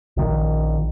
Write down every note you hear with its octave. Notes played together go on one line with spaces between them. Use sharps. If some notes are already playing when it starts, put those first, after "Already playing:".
A#1 D#3